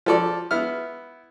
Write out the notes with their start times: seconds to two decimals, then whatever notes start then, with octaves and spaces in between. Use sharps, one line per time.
0.06 F3 A4 D5
0.51 B3 E4 F6